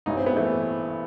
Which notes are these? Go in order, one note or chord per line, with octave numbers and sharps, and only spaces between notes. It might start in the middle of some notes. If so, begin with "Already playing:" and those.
A1 G2 E3 D#4
C4
B3
E3 A3